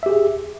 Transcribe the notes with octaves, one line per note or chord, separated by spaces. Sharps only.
G4 G#4 E5